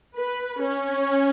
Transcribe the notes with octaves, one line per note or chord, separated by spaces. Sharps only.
B4
C#4